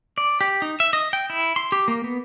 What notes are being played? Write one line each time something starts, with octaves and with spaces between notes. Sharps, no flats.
D5
G4
D#4
E5
D#5
G5
E4
C6
G4
A#3
B3